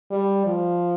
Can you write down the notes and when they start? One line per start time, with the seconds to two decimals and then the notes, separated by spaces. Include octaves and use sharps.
0.11 G3
0.46 F3